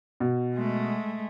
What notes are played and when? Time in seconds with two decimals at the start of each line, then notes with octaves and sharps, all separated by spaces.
0.20 B2
0.54 G#3 A3